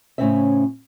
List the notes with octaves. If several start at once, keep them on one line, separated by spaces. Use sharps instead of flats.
A2 C#3 C4 C#4 E5